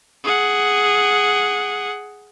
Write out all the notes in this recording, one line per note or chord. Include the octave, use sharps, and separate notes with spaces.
G#4 F#5